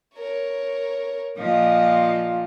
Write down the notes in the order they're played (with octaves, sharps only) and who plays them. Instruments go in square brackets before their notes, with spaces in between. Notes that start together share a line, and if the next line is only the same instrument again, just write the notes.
[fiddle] A#4 C#5
[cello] A#2 F3 [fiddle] D#5